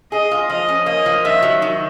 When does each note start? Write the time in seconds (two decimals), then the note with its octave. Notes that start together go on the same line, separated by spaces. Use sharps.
0.12 G#4 D#5
0.31 F4
0.50 F3 D#5
0.69 C#4
0.86 A#3 D#5
1.06 F3
1.24 D#3 E5
1.43 F#3
1.62 D#3